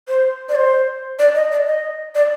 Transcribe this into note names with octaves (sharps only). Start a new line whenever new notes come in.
C5
D5
C5
D5
D#5
D5
D#5
D5